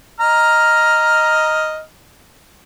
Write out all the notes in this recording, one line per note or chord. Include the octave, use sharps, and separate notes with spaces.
D#5 A#5 F6